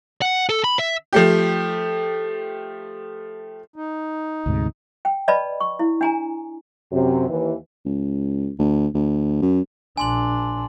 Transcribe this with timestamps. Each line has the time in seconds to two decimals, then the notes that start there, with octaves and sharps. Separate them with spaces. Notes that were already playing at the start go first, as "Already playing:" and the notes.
0.22 F#5
0.49 A4
0.64 B5
0.79 E5
1.13 F3 A3 G4
3.76 D#4
4.46 D2 G#2 C3
5.05 G5
5.28 B4 D5 D#5 A5 B5
5.60 C#6
5.79 E4
6.01 D4 G#5 A#5
6.92 F#2 C3
7.29 D#2 E3
7.86 C#2
8.59 D2
8.94 D2
9.42 F#2
9.97 A#1 D4 G#5 C6 F#7